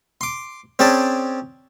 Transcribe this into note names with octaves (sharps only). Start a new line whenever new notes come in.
C6 D6
C4 C#4 G#4 D5 A5